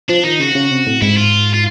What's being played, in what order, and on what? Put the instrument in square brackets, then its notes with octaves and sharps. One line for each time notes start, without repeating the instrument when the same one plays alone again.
[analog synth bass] F3 [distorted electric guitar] D4
[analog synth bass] D#3 [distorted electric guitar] D#4
[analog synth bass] C#3 [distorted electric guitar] F#4
[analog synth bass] C#3
C3
A2
[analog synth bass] G#2 [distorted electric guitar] E4
[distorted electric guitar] F4
F4